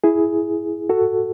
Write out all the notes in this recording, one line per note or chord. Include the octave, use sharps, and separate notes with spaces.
E4 G#4
F#4 A4